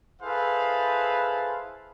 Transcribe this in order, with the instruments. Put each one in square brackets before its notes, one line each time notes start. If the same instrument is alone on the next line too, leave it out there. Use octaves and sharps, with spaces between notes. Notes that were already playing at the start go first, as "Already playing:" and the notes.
[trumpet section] E4 G#4 A4 B4 C5 F5